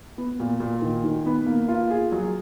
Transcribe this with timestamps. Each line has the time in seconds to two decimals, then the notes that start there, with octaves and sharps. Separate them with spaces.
0.18 B3
0.40 A#2
0.60 A#2
0.82 D#3
1.04 D#3
1.26 B3
1.46 A#3
1.68 F4
1.90 G#4
2.12 F#3